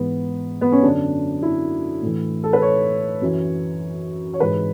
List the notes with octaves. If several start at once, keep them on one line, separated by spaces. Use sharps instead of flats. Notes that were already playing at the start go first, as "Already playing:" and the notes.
Already playing: G#2 E3 B3
B3
C#4
F#2 D3 F#3 D4
E4
A2 E3
A4
B4
C#5
F#2 E3
C#5
G#2 E3 B4